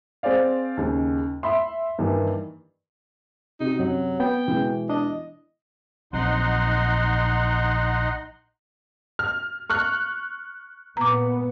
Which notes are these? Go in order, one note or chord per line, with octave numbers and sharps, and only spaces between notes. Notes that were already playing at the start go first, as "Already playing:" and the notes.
C4 G#4 C5 D5 F5
D#2 C#3
E5 B5 C6
G2 D#3 E3 A#3
C3 D#4 F#4
F#2 F#3
B3 G5
B2 E3 G#3
D4 D#5
A#1 F#3 C4 D#4 F#5 C6
F6
C#6 F6 F#6
A#2 B3 A#5 D6